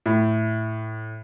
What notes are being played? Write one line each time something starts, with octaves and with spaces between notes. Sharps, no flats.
A2